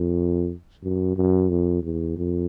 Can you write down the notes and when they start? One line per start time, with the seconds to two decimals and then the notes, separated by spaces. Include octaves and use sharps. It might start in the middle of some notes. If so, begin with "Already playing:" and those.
Already playing: F2
0.83 F#2
1.17 F#2
1.50 F2
1.83 E2
2.17 F2